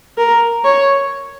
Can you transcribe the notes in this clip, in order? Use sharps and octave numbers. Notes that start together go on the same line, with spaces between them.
A#4
C#5